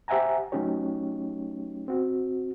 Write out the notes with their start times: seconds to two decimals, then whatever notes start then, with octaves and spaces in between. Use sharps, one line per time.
0.08 G4 C5 E5 F#5 G#5 A#5
0.52 F#3 A3 C#4 D#4 G4 C#5
1.88 C4 F#4